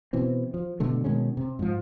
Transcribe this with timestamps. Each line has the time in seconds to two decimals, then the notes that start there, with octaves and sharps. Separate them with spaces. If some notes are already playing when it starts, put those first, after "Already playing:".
0.13 B2 E3 C4
0.54 F3
0.80 G2 B2 D3 A3
1.04 B2 D#3 G#3 C#4
1.37 C3
1.59 G#2 F3